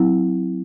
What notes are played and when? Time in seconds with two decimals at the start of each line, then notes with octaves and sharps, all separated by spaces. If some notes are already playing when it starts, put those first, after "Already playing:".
Already playing: F#3 C4 E4